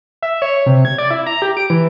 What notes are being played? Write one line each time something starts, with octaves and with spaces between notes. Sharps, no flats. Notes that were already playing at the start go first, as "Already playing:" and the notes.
E5
C#5
C3
G#6
D5
E4
A#5
G4
D7
E3